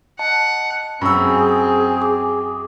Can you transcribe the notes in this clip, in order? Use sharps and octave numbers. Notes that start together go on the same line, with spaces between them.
D#5 F#5 A5
F#2 C4 G#4 B5 E6
D6